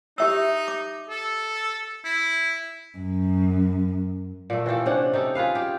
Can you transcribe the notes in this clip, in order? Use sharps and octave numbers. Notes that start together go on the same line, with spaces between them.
D#4 G4 E5 E6
D6
A4
E4
F#2
A#2 A3
E3 F4 G4 A4
C3 C#4 D4 F#5
D#4 G4 A4
F4 G#4 B4 F5
G4